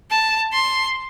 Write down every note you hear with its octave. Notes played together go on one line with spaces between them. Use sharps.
A5
C6